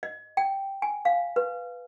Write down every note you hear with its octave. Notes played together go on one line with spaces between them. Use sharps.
D#5
G5
G#5
F5
B4